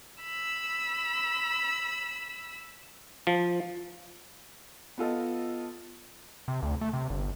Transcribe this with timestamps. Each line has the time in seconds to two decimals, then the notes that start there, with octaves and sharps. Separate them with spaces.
0.21 B5 E6
3.27 F3
4.98 B3 F4 A4 D#5
6.48 C3
6.63 D2
6.81 A3
6.93 C3
7.10 G1